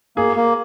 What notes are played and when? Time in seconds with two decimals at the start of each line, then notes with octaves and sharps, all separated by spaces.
0.16 A#3 G#4
0.37 A#3